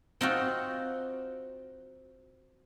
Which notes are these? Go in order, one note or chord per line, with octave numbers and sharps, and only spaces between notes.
C4 D#4 F4 F#4